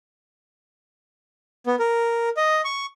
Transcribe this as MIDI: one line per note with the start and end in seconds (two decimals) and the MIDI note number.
1.67 1.75 59
1.79 2.29 70
2.37 2.61 75
2.65 2.86 85